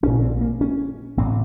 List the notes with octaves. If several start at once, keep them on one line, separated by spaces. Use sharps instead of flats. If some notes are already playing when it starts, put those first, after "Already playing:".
A#1 A#2 C#4
C4
A#3
C#4
A1 A2 C4